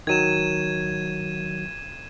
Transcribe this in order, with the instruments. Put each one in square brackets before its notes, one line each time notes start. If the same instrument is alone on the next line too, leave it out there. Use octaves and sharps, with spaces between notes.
[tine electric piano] D#3 F#3 [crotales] G#6 D#7 E7